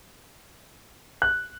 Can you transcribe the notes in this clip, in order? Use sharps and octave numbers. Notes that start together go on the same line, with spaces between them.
F#6